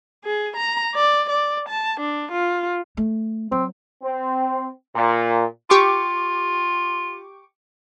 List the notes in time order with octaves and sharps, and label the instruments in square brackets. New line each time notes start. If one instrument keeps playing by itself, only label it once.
[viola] G#4
A#5
D5
D5
A5
D4
F4
[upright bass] A3
[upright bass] F#3 [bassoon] C4
[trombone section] C4
A#2
[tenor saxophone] F4 [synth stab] G4 C#6 D6